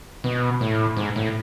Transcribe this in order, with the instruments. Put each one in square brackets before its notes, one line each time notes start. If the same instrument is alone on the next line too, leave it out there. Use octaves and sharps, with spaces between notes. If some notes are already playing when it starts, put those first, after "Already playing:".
[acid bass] B2
A2
G#2
A2